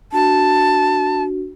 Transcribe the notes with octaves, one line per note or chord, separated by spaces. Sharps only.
D4 F#4 A5